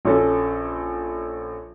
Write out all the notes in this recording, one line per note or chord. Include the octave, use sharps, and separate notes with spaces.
A#1 C#4 A4